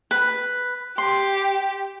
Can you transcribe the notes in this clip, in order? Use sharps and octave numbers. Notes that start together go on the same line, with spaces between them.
B4
G4 C6